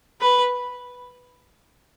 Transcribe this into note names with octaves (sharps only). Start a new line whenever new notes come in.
B4